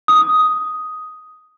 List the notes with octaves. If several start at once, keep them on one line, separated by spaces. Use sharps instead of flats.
D#6